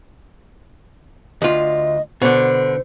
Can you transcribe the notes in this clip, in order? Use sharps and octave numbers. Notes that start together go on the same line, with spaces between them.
D2 F4 D#5
B2 D3 C5